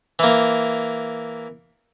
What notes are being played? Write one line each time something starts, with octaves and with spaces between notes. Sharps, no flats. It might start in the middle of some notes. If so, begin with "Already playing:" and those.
E3 A#3